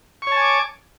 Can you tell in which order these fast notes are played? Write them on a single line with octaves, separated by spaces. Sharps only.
C#6 C#5 A5 G#5 D6